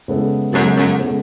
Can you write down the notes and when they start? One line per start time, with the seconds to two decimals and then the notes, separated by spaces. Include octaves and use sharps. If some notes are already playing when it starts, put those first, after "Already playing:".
0.08 C#3 G#3 B3 E4 A4
0.52 F#2 C#3 G#3 B3 E4 A4
0.76 F#2
0.99 C#3 G#3 B3 E4 A4